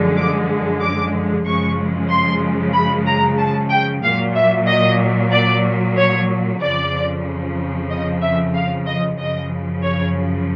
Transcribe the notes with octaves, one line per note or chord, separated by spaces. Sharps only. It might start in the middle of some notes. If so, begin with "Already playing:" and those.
Already playing: F#2 D3 F3 G#3
D6
D6
F#2 C#3 F3 G#3 C#6
C6
B5
A#5
A5
G5
A#2 F#3 F5
E5
D#5
D5
C#5
F2 C#3 F3 D5
D#5
E5
F5
D#5
F#2 C#3 F3 D#5
C#5